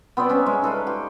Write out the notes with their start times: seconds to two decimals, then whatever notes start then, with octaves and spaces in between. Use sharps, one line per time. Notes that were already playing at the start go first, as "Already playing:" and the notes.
0.17 B3 C4 C5 D5
0.29 C#4 E5 A#5
0.46 G#3
0.62 D#4 A4 B4 F5
0.87 G4